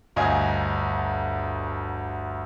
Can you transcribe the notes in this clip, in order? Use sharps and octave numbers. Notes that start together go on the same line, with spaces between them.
G1 D2 D#5 F5 G#5 G#6